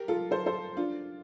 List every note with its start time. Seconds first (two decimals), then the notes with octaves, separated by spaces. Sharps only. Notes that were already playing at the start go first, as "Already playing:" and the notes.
Already playing: G4 A#4
0.08 F4 A4
0.31 A4 C5
0.46 A4 C5
0.77 D4 F4